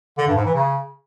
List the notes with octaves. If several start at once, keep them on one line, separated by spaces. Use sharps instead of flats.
D3
G2
G#2
E3
C#3